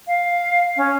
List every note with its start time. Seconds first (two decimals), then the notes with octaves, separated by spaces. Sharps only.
0.07 F5
0.76 C#4